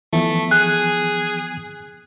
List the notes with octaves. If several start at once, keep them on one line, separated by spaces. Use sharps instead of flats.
E3 F3 A3 B3
G#4 F#6